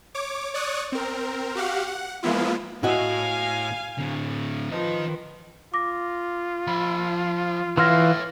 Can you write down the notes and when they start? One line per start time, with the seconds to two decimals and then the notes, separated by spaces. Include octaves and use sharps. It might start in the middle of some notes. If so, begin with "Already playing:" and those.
0.15 C#5 D6
0.54 C#5 D5 C#6 D#6 F#6
0.92 C4 A#4
1.55 F#4 G4 F5 F#5
1.87 F#5
2.23 F3 G#3 A#3 B3 E4 F4
2.83 A2 E4 F#4 D#5 F5 G#5
3.98 A2 D3
4.71 D#3 F3 B4 D#5
5.74 F4 D6 A#6
6.67 F3 B5
7.77 E3 C#5 E5 F5 C6 F6 A#6